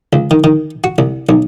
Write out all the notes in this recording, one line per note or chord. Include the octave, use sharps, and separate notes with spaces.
C#2
D#3
D#3
F#4
C2
B1